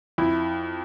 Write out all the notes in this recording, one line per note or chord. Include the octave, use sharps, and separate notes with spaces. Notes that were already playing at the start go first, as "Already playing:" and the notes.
F2 E4